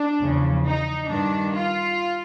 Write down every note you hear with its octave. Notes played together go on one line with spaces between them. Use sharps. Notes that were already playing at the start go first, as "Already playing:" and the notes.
Already playing: D4
E2 C#3 F3
D#4
G2 D#3 D4
F4